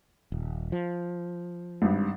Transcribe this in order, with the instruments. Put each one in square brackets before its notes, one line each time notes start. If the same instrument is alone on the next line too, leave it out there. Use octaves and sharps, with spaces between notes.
[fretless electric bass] D#1
F3
[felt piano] G#1 G2